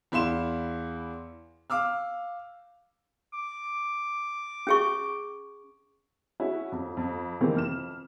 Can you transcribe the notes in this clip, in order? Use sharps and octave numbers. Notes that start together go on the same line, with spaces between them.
E2 E4 F5 C6 E7
F5 D6 E6 F6
D6
C#4 G#4 C#6
C#4 E4 F#4 G#4
F2
F2
C3 D#3 E3 G#3 A#3 C4
F2 F6 E7